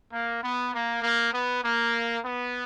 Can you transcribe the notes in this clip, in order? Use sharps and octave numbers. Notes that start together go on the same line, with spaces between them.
A#3
B3
A#3
A#3
B3
A#3
B3